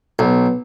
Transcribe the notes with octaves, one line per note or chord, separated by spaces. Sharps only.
B1